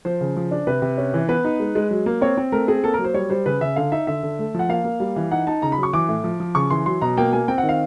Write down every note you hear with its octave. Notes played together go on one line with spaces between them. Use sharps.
F3 C5
C#3
F3
D4
C3 B4
C3
C#4
E3
B3 B4
D#4
G#3
G#3
F#3
A#3
C4 C#5
C4
A3 A#4
C4 G#4
A#3 A4
A#4
F#3
C5
G3 C#5
G3 C5
C#3 B4
C#3 E5
D3 F5
D#4 E5
D3 E5
D3
A3
F3 F#5
A#3 F5
A#3
G3
E3
D#4 F#5
D#4 A5
C#3 A#5
B5
F#3
C#6
E3 D6
A2
F3
F3
C#3 C#6
E3 C6
F#3 C6
B2 A#5
A#3 G5
A#3 G#5
C4 G5
F#5
D#3
F5